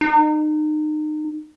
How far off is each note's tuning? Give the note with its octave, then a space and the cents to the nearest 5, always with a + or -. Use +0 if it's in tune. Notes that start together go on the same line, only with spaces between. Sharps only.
D#4 -30